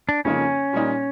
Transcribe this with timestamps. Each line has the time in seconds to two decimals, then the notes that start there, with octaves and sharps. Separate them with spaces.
0.09 D4
0.25 F2 C#3 F3 A#3 C#4 D#4
0.73 A#2 G3 A#3 D#4